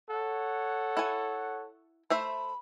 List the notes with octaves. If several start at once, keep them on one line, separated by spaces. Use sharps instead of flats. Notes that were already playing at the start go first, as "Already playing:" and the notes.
A4 C#5 F#5
E4 G#5
A3 C5 E5 B5